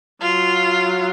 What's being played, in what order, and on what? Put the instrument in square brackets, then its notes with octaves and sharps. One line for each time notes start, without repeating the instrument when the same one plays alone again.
[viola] F#3 [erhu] F4